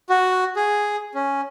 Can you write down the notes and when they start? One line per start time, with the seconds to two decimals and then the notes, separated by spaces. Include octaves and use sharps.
0.09 F#4
0.56 G#4
1.14 C#4